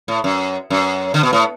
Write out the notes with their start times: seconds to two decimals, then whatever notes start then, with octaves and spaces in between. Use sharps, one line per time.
0.08 A2
0.24 F#2
0.70 F#2
1.14 D3
1.23 B2
1.33 A2